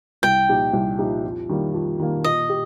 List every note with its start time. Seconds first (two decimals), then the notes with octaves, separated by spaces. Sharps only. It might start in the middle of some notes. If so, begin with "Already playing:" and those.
0.23 C2 G5
0.49 A#2 F3 D#4 G4
0.73 C2
0.99 A#2 F3 D#4 G4
1.24 F2
1.49 D#3 G3 A#3
1.74 F2
1.99 D#3 G3 A#3
2.24 A#2 D#5
2.49 G4